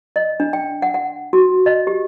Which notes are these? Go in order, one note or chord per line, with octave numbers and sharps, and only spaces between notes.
D#5
D4
G5
F#5
F#5
F#4
D#5
G4